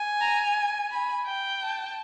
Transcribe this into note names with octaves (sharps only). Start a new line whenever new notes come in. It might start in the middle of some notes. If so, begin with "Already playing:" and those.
Already playing: G#5
A#5
B5
G5
A5